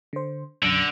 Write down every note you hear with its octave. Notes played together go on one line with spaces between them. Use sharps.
D3 C5
B1 F#2 D3 A#6